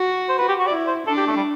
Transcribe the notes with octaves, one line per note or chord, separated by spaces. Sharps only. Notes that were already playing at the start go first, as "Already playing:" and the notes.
Already playing: F#4
C5
B4
G4
F#4
E4 D5
C5
D4 A4
G4
A3
G3